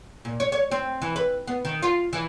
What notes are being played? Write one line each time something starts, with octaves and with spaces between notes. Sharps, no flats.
A#2
C#5
C#5
C4
E3
B4
B3
D#3
F4
E3